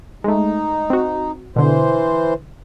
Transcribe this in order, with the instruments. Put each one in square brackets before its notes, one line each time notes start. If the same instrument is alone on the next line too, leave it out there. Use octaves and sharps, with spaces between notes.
[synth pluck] G#3 A3 [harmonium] D#4
[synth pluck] C4 F#4
[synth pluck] B2 D3 [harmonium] E3 C5